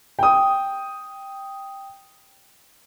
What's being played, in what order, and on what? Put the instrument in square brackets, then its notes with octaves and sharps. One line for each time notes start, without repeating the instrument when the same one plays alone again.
[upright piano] G5 D#6